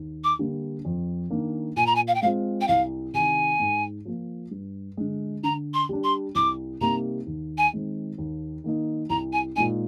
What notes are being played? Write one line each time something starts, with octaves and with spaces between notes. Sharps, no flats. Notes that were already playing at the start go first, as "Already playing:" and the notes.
Already playing: D#2
D6
D3 G3 A#3 D4
F2
D#3 A#3 D4
A#2 G#5
A#5
G#5
F5
G5
G#3 C4 F4 F5
G5
C2 F5
C3 D#3 G#5
G#2
F3 A#3 F4
G2
D3 G#3
D3 A#5
C6
G3 D4
C6
C2 D6
C3 G3 A#3 D#4 A#5
D#2
G#5
D#3 G#3 C4
D#2
D#3 A#3 D#4
C2 A#5
G#5
A#2 G#3 D#4 G#5